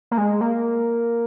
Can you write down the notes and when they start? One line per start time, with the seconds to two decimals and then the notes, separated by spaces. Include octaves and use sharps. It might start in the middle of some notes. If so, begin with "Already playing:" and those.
0.11 A#3
0.18 G#3
0.41 A#3